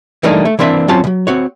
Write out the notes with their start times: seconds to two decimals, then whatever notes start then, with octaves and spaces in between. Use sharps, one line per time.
0.23 E3 G3 A3 A#3 D4 D#4
0.45 A3
0.59 E3 A#3 C4 D4 E5
0.88 F#3 C4 C#4 F4 A5
1.04 C#2 F#3
1.27 C4 F#4 C#5